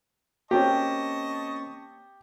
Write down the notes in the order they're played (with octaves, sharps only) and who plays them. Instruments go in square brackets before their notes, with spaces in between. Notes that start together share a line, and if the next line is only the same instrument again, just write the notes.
[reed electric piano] A#3 C4 C#4 [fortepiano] G4 [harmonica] D#5 A5 C#6